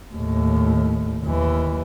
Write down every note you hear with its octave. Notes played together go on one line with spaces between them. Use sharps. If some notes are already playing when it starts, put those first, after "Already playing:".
D#2 A2
D#2 E3